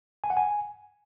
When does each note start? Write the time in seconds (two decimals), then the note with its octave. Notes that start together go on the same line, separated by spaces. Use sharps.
0.24 G#5
0.30 F#5
0.37 G#5